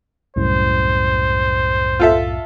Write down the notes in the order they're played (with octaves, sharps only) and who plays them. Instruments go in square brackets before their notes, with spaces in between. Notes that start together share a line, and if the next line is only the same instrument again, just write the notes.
[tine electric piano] C2 F#2 A2 [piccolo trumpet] C5
[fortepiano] F4 A4 E5